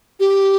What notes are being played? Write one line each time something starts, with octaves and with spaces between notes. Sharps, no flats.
G4